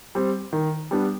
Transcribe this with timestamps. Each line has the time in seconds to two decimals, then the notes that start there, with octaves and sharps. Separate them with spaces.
0.15 G3 C4
0.53 D#3
0.91 G3 B3 D4